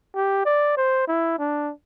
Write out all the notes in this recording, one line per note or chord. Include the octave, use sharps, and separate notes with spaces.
G4
D5
C5
E4
D4